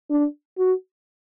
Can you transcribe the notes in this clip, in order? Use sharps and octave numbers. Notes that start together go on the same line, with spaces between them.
D4
F#4